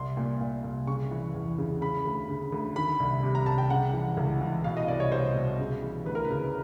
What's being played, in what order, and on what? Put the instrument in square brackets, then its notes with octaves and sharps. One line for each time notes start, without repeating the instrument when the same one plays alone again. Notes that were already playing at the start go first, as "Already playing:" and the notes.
Already playing: [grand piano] C2 C6
A#2
A#2
C2
C#3 C#6
E3
E2
C#3
C#3 B5
D2
C#3
D2
D#3 B5
C2
C3
A#5
C2 A5
G5
C#3 F#5
E3
C#2
E3
B2 F5
D#5
C2 D5
C#5
C2 C5
B2
C#3
E3
D2 B4
A#4
C#3 B4